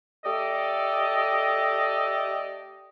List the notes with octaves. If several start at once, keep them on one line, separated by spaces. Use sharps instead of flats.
A3 G4 A4 D5 D#5